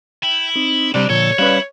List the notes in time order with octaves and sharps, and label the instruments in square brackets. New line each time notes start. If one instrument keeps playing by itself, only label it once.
[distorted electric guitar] E4 [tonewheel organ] G5
[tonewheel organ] C4 D#4
[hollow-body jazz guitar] C3 G3 [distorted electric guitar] C4 A4 [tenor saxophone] D4
[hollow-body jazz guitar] A#2 [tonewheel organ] D3 F3 [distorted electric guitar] A4 [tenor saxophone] C#5
[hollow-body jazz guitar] G3 C#4 B4 [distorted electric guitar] E4 [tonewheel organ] D5 F5 F#6